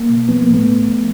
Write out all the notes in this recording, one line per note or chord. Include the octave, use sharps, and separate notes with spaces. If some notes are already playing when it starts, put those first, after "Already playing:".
Already playing: A#3
B2
F3 B3
A#3
A2
A3 B3
A2
F3